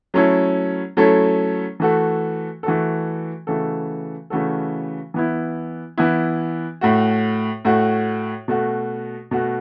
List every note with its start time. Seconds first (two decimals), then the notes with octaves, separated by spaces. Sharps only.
0.14 F#3 A3 C#4 E4 A4
0.97 F#3 A3 C#4 E4 A4
1.80 E3 A3 F#4 A4
2.63 E3 A3 F#4 A4
3.47 C#3 E3 A3 F#4 A4
4.30 C#3 E3 A3 F#4 A4
5.14 E3 B3 E4
5.98 E3 B3 E4
6.81 A2 A3 F#4
7.65 A2 A3 F#4
8.48 B2 A3 F#4
9.31 B2 A3 F#4